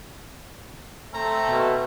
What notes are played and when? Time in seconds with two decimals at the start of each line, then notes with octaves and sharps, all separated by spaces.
1.13 A3 C4 A4 A#5
1.45 B2